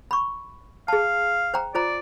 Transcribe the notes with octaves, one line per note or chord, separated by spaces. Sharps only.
B5 C#6
G#4 F5 A5
C5 G5 A#5
F4 C5 D5 A#5